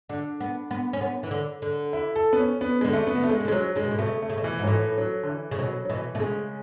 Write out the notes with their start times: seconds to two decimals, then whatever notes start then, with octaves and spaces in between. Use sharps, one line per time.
0.09 D3 D4
0.40 B3
0.71 B3
0.93 C#4
1.01 B3
1.23 E3
1.31 D3
1.62 D3
1.93 E4
2.16 A4
2.33 B3
2.39 C#4
2.61 B3
2.81 D3 G#3
2.93 A3
3.07 B3
3.15 D3
3.23 A3
3.30 G#3
3.40 D3
3.45 C#3 G#3
3.52 F#3
3.76 C#3 G#3
3.83 B2
3.91 A2
3.98 B2 A3
4.06 C#3
4.22 A3
4.29 C#3
4.37 B2
4.44 E3
4.59 G#2
4.63 F#3
4.67 A2 E3
4.98 F#3
5.23 D3
5.29 E3
5.51 C#3
5.59 B2 F#3
5.85 F#3
5.89 B2 E3
6.15 B2 A3
6.20 C#3 G#3